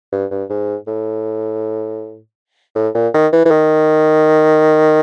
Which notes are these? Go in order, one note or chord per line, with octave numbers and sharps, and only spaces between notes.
G2
G2
G#2
A2
A2
A#2
D#3
E3
E3
D#3